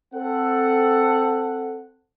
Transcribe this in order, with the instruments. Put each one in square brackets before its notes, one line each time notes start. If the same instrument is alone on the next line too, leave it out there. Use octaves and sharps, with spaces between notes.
[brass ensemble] C4 A4 F#5